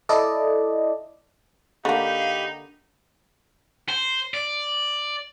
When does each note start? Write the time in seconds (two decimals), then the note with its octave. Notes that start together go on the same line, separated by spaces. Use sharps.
0.09 E4 A4 D5 D#5
1.85 D3 A#3 D#4 G4 F5 B5
3.89 C5
4.34 D5